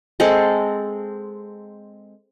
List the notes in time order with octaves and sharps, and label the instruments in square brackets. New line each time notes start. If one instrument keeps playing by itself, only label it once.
[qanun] G#3 C4 A4